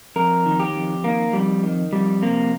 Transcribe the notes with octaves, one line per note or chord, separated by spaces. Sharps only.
F2 A#4
D#3
G4
F2
D#3 A#3
F2 G3
D#3
F2 G3
C3 A#3